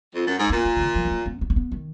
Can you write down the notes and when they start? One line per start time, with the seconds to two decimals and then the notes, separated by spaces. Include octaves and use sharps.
0.15 F2
0.26 F#2
0.38 G#2
0.50 A#2 B3
0.65 A#3
0.76 C#3
0.81 D#3
0.95 F3
1.05 B3
1.11 A#3
1.26 B3
1.41 B3
1.50 A#3
1.56 B3
1.72 D#3